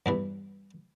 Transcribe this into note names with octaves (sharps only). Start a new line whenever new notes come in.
E2 G2 E3